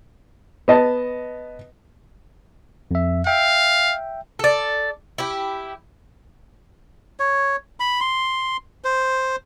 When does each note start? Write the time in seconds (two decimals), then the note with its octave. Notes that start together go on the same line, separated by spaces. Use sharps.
0.68 B3 D#5 A5
2.91 F2 E5
3.27 E5 F5 G5
4.39 A4 D5
5.18 E4 G4
7.20 C#5
7.80 B5
8.00 C6
8.84 C5